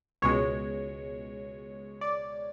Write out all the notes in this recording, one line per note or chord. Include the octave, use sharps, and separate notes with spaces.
C#2 B2 G#3 C#5
D5